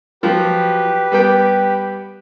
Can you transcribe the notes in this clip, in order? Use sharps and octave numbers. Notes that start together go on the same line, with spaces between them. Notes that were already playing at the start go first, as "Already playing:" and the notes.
F3 F#3 G4 B4
G3 B3 G5